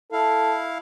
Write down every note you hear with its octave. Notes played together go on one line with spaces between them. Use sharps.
E4 A4 F5